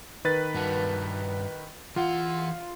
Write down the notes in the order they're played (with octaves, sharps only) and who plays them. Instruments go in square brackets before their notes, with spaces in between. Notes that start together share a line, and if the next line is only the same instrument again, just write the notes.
[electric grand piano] D#3 B4 A6
[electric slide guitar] G2 F#4 A5
[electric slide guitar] E3 F#5 [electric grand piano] F4